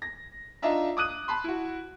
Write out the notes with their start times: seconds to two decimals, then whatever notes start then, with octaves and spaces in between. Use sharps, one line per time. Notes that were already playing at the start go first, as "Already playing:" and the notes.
0.02 A#6
0.62 D4 D#4 F4 D#5 E5 A#5
0.97 D6 D#6 F#6 D#7
1.28 A5 B5 C6
1.44 E4 F#4